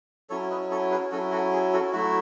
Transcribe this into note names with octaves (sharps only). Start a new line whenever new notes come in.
F#3 C#4 E4 A4 C#5
B4 D#5
A4 C#5
G#4 B4
F#3 C#4 E4 F#4 A4
F#4 A4
G#4
F#4 A4
F#3 A3 E4 F#4